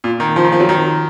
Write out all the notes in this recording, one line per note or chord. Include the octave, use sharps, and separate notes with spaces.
A#2
D#3
F3
D#3
F3
F#3
D#3